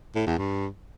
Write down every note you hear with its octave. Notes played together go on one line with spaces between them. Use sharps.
A2
E2
G2